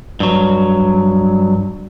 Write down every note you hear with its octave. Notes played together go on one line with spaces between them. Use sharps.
G2 F#3